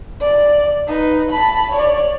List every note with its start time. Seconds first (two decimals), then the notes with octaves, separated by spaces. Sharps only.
0.21 D5
0.87 D#4 B4
1.31 A5 B5
1.72 C#5 D5